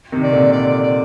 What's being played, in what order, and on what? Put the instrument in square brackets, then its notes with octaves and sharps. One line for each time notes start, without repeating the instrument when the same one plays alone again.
[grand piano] C3 D#3
[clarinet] D5
[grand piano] A#2 D3
[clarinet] D5
D5
D5